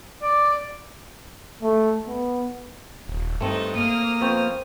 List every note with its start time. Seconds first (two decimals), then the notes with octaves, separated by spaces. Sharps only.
0.22 D5
1.63 A3
2.08 B3
3.08 D#1
3.41 G2 A3 C4 D#4 A4
3.75 A#3 D#6 F6
4.21 F2 B3 C4 C5 C#6 G6